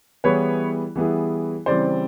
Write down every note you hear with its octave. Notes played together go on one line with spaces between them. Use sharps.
E3 G3 B3 E4 G#4 B4 C#5
E3 G3 B3 E4 G#4
C#3 E3 G3 C4 C5 D5